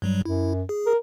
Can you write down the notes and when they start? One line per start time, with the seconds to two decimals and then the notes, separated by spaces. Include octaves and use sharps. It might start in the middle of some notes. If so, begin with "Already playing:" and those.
0.02 G2 F#3 G3
0.25 F#2 E4
0.69 G#4
0.86 A#4